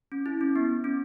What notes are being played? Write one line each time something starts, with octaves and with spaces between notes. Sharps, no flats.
C#4
E4
C#4
B3
C#4